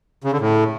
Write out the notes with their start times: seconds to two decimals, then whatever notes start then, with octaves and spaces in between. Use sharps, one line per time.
0.24 C#3
0.32 D3
0.40 A2